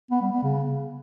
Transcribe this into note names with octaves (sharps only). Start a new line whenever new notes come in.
B3
G3
B3
C#3